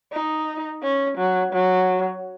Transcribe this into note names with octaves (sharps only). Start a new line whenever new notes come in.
D#4
C#4
F#3
F#3